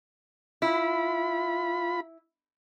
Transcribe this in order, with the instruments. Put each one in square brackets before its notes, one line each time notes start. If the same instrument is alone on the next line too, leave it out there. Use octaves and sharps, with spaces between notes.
[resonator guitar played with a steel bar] E4 [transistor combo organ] F4 B5